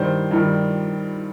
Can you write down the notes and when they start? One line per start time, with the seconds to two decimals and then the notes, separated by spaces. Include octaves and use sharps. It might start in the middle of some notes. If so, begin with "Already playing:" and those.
Already playing: G2 D#3 G3 C5
0.31 G2 D#3 G3